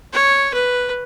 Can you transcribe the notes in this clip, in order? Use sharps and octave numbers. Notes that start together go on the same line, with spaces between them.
C#5
B4